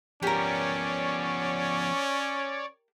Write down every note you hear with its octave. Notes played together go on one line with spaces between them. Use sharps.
F3 B3 C#4 G4 A#4 C#5 D5